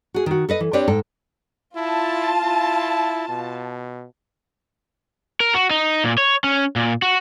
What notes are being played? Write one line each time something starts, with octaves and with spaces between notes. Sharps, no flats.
F#4 G#4
D#3 F#4
A4 B4 D#5
E3
C4 D4 G4 B4 C#5 D5
G#2 A4 G5
E4 F4 A5
E4
B2
A#4
F#4
D#4
A#2
C#5
C#4
A#2
F#4